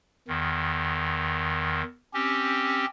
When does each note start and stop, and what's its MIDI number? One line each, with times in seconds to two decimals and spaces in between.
0.28 1.83 40
0.28 1.83 51
2.14 2.85 60
2.14 2.85 61
2.14 2.85 67